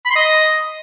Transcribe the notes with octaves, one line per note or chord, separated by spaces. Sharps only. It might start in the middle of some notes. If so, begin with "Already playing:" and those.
B5
C6
D#5